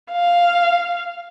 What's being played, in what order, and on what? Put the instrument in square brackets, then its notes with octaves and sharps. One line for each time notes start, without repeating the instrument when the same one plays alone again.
[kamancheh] F5